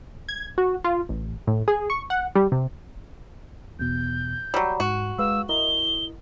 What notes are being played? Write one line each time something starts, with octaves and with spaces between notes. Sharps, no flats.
G#6
F#4
F4
A1
A2
G#4
C#6
F#5
G3
C3
E2 B2 G6
F#3 G3 E6
G#2 F#4
G#3 B4 F5 E6
E4 A#4 D#5 G7